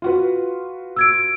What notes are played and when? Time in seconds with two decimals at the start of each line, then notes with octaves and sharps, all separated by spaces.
0.02 F4 F#4 B4
0.96 E6 G#6 D7